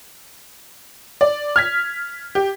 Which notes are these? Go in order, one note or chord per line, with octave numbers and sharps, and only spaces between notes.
D5
F6 G#6 B6
G4